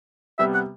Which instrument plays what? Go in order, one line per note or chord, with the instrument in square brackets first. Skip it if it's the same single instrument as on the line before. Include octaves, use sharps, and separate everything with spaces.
[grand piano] C3 G3 B3 [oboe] E5
[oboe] F#5